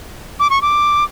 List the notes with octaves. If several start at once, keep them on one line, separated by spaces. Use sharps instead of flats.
D6
C#6
D6